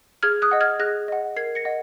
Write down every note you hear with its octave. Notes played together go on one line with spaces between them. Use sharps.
G#4 F6 G#6
D#6 F#6
D#5 F#5
F6 G#6
G#4 F#6 A#6
D#5 F#5
A#4 G#6 C7
A#6 C#7
D#5 F#5